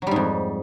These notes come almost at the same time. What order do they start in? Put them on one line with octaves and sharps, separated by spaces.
F#3 G3 G#2 F2